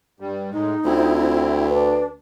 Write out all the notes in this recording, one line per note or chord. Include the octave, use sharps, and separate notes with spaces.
G2 G3
A2 G#3 D#4
D2 C4 E4 F4
D4 B4